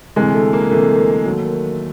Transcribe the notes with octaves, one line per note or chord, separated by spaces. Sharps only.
D2 C3 E3 G#3
A3
A#3
D2 C3 E3 A3
D#2 D#3 F#3